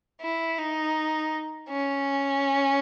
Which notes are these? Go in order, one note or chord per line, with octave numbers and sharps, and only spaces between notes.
E4
D#4
C#4